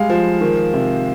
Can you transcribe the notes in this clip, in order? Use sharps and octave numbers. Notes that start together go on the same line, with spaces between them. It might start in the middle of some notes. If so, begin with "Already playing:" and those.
Already playing: G3 G#3 F5
F3
D#3
C3